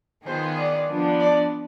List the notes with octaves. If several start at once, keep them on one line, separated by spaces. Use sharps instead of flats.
D#3 B3 F4 G#4 C5
D5
F3 B3 D4
D5